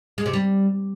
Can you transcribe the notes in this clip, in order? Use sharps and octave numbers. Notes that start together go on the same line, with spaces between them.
G#3
C3
G3